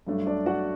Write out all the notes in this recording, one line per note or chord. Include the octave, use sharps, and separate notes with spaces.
G2 F#3 A3 D4
D4 D5
F#4 F#5